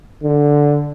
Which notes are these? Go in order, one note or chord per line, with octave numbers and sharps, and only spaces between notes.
D3